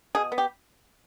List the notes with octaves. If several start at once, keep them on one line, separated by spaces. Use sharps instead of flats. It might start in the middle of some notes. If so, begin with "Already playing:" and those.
B2 G#4
B3
G4